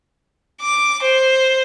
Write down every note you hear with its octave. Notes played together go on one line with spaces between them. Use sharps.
D6
C5